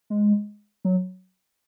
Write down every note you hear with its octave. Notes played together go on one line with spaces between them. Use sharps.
G#3
F#3